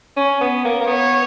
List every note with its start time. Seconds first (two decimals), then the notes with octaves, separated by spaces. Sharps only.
0.17 C#4
0.41 B3
0.65 A#3
0.81 A#3
0.88 B3 C#5